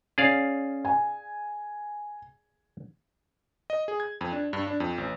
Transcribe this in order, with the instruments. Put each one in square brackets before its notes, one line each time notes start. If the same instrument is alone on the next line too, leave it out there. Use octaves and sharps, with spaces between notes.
[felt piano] C#4 [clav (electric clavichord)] G#4 D5 F5
[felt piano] G#5
[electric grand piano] D#5
G#4
G#6
F2
D4
G2
D4
F2
A1